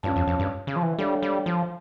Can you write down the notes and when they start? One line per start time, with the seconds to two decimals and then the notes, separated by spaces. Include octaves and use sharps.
0.03 G2 C#4 F4 C#5 F5 A5
0.16 F2
0.27 F2
0.39 G2
0.67 C#3
0.76 F3
0.83 E3
0.98 G3 D4 A4 C#5 F5
1.23 G3
1.46 F3